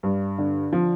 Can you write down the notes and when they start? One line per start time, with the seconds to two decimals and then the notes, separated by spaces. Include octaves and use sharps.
0.03 G2
0.38 D3
0.73 F3